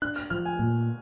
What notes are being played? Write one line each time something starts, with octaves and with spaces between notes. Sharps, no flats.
D4 F#6
F6
F3 F6
G#5
A#2